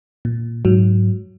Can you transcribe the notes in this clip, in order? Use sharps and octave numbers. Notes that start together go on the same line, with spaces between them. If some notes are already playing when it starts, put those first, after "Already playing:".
A#2
G#2 F#3